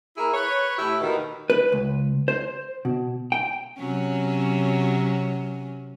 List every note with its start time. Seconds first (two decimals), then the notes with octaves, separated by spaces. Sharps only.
0.17 A#3 E4 G#4
0.33 B4 C#5
0.77 A2 E4 G4
1.01 D#2 B2 D#3
1.50 B4
1.72 C#2
2.28 C5
2.85 B2
3.32 G5
3.79 C3 F#3 C#4